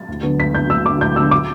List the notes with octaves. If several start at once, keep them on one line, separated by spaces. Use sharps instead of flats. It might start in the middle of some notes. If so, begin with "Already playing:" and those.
Already playing: A6
D2
D3 B3
D2 B6
D3 B3 G6
D2 E6
D3 B3 D6
D2 G6
D3 B3 E6
D6